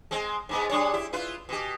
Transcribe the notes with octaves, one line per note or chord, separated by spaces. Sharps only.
G#3 C4
G#2 G#3 B3
G3 D4 C#5
E4 G4
E4 F4 B4
B2 G4